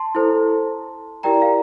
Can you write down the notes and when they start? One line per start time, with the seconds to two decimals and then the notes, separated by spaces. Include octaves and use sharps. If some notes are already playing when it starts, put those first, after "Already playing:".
Already playing: A5 C6
0.15 E4 A4 C5
1.23 E4 G4 A#4 D5 G5 A#5
1.42 F5